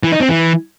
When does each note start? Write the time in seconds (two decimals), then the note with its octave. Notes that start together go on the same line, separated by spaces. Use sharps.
0.03 E3
0.12 D#4
0.20 C4
0.29 E3